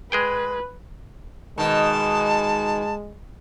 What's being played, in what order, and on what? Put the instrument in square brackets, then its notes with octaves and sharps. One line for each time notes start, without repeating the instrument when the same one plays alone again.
[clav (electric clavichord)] G#3 G#4 G5 [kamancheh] B4
[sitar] B2 D#3 [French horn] G#3 [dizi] A5